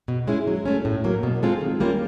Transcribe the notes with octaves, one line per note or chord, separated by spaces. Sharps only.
B2
G#3 C#4 E4 G#4
F#3
A3 C#4
A2
F#3 A#3
B2
G#3 C4 F4 A4
D#3
G3 A#3 C#4 F4